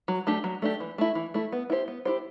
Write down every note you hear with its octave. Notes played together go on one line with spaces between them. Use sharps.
F#3
A3 D4 G4
F#3
A3 D4 G4
E3
A3 E4
E3
A3 E4
B3
E4 G4 C5
B3
E4 G4 C5